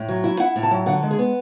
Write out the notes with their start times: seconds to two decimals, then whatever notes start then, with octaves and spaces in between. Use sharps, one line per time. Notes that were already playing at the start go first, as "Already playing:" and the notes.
Already playing: A2
0.08 F#3
0.24 E4
0.40 E4 F#5
0.56 A2
0.63 A5
0.71 F#3
0.86 D3 F#5
1.03 G#3
1.11 G#4
1.19 B3